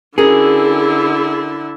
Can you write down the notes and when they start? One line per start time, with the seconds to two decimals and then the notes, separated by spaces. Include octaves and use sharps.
0.18 D3 C#4 E4 F#4 G#4 A#4